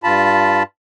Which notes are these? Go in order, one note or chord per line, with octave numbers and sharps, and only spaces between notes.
G2 F4 A5 B5